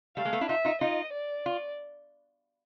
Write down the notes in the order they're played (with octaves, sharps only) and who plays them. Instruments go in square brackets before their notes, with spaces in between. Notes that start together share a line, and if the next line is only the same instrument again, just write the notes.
[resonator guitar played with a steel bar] G3 A3 [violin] F5
[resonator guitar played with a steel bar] G#3 A#3
A3 B3
D4 E4
[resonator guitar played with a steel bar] D#4 F4 [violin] E5
[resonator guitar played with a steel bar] D#4 F4
[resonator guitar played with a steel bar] D#4 F4 [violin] D#5
[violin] D5
[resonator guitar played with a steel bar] F4